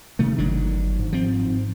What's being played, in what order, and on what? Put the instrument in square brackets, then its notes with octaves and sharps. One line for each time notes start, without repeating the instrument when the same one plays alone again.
[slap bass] C3 D#3 A3
[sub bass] G1 [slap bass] D#3 F#3 D4
[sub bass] G#2
[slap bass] F3 C4